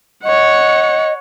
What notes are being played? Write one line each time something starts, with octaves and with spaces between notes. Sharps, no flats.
C#5 D#5 F#5